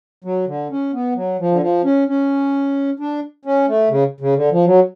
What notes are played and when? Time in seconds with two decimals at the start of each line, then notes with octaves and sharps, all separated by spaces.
0.24 F#3
0.47 D3
0.71 C#4
0.93 B3
1.16 F#3
1.40 F3
1.51 D3
1.61 F3
1.84 C#4
2.08 C#4
3.00 D4
3.45 C#4
3.68 A3
3.90 C#3
4.21 C#3
4.36 D3
4.52 F3
4.66 F#3